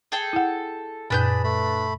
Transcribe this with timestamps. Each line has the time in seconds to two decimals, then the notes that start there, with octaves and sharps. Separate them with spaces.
0.12 G#4 A4 G5
0.33 E4 F#5
1.10 F#2 A#2 D4 G#4 B4 B5 G6
1.44 A3 B5